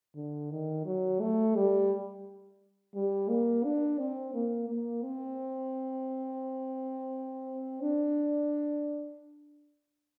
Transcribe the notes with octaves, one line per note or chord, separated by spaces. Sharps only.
D3
D#3
F#3
A3
G3
G3
A#3
D4
C4
A#3
A#3
C4
D4